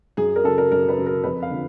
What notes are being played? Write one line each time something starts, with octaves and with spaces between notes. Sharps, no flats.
F#2 G#4
A#4
C#3 F#3 A4
A#4
F#2 A#4
B4
C#3 F#3
A#4
F2 B4
F5
D3 F3